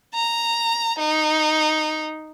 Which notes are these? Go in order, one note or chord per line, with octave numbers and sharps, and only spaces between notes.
A#5
D#4